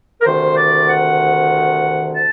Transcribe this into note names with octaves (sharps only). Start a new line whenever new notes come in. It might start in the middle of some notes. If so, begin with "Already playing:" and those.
A#4
D2 C3 D#3 C5
D5
F#5
A5